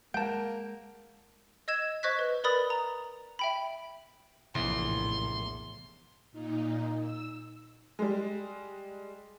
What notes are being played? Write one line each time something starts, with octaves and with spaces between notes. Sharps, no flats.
G#3 A#3 F#5 A5 G6 D7
D#5 E6 G#6 E7
C5 D#5 C#6 F#6 G#6 B6
B4
A#4 B4 D5 B5 D#6 A6
A#5
E5 G5 B5
A#1 E2 A2 C3 E3 B3 C6
A#2 D#4
E6
G3 G#3